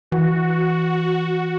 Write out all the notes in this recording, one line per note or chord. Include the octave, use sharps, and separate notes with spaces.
E3 F#4